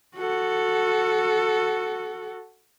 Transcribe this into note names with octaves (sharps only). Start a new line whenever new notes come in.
F#4 A4